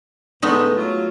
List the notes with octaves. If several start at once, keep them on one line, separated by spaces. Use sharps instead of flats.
A2 D3 G#3 A3 B3 D#4
F#3 F4